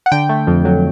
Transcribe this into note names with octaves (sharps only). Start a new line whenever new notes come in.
F#5
D3 G5
A3
F2
F#3